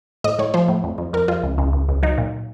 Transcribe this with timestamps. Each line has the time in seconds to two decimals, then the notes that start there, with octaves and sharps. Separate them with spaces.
0.24 A2 D#5
0.39 A2 C#5
0.54 F3 C5
0.68 A2
0.84 F2
0.98 F2
1.13 F2 A#4
1.28 F2 F4
1.43 C#2
1.58 C#2
1.73 C#2
1.89 C#2
2.03 F#3 D#4
2.18 A#2